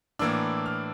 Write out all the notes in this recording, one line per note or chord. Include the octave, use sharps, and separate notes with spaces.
A2 E3 A#3 D4 E6
F6